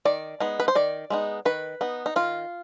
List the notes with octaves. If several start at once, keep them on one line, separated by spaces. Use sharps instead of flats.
D#3 D5
G#3 B3 D#4
B4
C5
D#3 D5
G#3 B3 D#4
D#3 B4
B3 D#4
D#4
D#3 F4